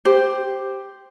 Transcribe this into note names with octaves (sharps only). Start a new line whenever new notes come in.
G4 C5